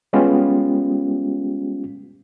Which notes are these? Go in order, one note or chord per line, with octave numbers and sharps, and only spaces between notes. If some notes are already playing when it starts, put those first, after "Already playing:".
G3 G#3 B3 C#4 F4 G4